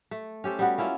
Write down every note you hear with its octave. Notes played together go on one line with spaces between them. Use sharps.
A3
C#4 G4 A4 C5
G3 B3 F#4
A#3 C#4 E4 F4